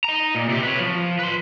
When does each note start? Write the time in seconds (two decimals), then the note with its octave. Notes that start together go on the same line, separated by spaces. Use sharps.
0.04 D#5 A#5
0.35 A#2
0.49 C3 G4
0.63 B4 C#5
0.79 F3
1.19 B4 C6